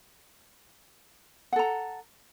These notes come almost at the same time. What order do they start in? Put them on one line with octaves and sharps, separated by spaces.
F#5 A4 A#5